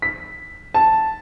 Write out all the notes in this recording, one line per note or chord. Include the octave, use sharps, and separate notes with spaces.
B6
A5